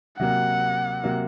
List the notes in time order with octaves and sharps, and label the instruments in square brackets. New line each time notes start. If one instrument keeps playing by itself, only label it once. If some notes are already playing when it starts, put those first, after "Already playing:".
[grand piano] C3 F#3 A#3 [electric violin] F#5
[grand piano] C3 F#3 A#3